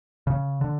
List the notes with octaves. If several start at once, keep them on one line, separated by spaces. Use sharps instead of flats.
C#3
D3